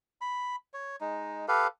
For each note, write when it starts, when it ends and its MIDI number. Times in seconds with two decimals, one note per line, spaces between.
0.21 0.56 83
0.74 0.96 73
1.01 1.46 56
1.01 1.46 63
1.48 1.67 67
1.48 1.67 69
1.48 1.67 71
1.48 1.67 77